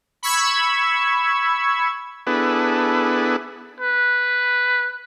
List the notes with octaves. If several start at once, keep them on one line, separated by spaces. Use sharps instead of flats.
B5 C#6 E6 G#6
B3 D4 E4 G#4 A4 B4
B4